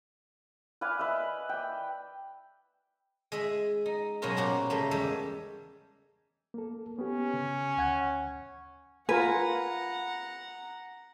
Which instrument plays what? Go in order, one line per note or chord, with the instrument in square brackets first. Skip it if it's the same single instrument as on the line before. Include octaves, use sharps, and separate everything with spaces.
[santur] B4 D5 F5 G#5
B4 D#5 E5
D5 G5
[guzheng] G#3 G#4 E5
D#4
B2 F#3 A#3 C#4 F4 A#4
A#2 F#4 G4 A#4 C5
C#3 G3 A3 A#3
E2 G3 G#3 E5 A5
[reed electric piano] A#3 A4
[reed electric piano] B3 G4 [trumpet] C#4
[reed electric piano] C#3
D2 F#5 G#6
[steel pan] F4 A#4 G#5 [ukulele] B4 [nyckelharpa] F#5 A#5